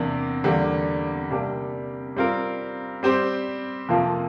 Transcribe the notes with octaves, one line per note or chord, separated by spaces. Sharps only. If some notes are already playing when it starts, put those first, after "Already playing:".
Already playing: E2 C3 A#3 D4
E2 D3 G3 A#3
C3 G3 A#3 D4 G4
G3 C4 F4 A#4
G3 C4 G4 C5
F2 C3 F3 A#3 F4